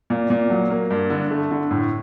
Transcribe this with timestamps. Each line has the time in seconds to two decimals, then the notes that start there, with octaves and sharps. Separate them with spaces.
0.10 A#2
0.30 A#2
0.50 F#3
0.70 A#3
0.90 G2
1.10 D3
1.30 A3
1.51 D3
1.71 A2